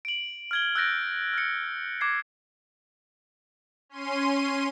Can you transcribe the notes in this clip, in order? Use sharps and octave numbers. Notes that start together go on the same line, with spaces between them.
D7 F#7
F6 G#6 G7
E6 F#6 G6 A6 A#6 D7
F6 C#7
D6 G#6 C7
C#4 C6 D#7